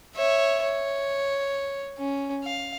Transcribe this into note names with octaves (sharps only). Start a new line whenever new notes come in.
C#5 E5
C#5
C#4
F5